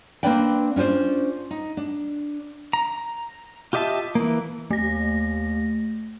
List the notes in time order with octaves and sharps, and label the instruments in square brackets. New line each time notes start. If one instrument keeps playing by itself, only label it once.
[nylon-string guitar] A#3 C4 D4 B4 D5 G5
C#4 D4 F4 C5 D5
D#4
D4
[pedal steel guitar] A#5
F4 G4 D#5 E5 A5
E3 A#3
[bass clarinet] D#2 [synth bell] A3 A#6